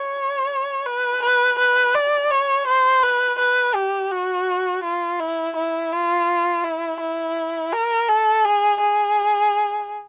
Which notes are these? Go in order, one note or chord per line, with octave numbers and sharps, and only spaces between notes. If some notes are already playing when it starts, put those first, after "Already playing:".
Already playing: C#5
B4
B4
B4
D5
C#5
C5
B4
B4
G4
F#4
F4
E4
E4
F4
E4
E4
A#4
A4
G#4
G#4